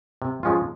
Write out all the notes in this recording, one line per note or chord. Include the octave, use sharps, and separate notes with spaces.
C3
F3 G#3 C#4 F4